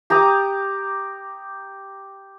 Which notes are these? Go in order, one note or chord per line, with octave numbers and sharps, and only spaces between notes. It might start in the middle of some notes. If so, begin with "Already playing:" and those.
G4 A#5 D6 D#6